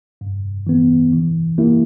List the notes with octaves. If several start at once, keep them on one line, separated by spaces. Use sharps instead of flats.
G2
E3 B3
E3
A#3 E4 G4